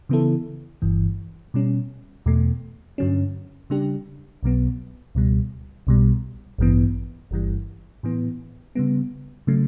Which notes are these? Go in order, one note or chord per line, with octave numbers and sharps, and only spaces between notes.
C#3 E3 B3 E4 A4
G1 G2 E3
B2 G3 C#4
E2 B2 A3
G2 D3 F#3 C#4
C#3 G3 D4 G4
B1 B2 F#3 B3
C#2 B2 G3
B1 B2 G3
A1 G2 E3 B3
G1 G2 E3 G3
A2 E3 B3
C#3 G3 B3
C#3 F#3 A3